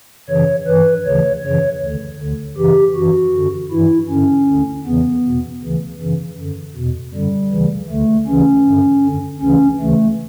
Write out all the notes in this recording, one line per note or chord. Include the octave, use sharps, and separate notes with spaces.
F#2 C#3 E3 C#5
G2 E3 B4
D2 C#3 E3 C#5
F#2 C#3 E3 C#5
D2 D3
D2 D3
F#2 C#3 E3 G4
F#2 E3 F#4
F#2 D3
G2 E3 E4
G2 D3 C#4
D2 D3
E2 C#3 E3 B3
E2 B2
D2 C#3 E3
F#2 C#3 E3
F#2 D3
E2 B2
F#2 D3 G3
D2 C#3 E3
D2 D3 A3
D2 C#3 E3 C#4
G2 D3
F#2 D3
D2 C#3 E3 C#4
D2 C#3 E3 A3